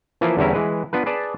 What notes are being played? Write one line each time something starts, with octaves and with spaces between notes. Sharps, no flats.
E3 F3 A#3 E4 F4
E2 D3 G3 C#4 E4 A#5
E3 G#3 B4
B3 D4 F4 B4
G#4 B4 D5 A5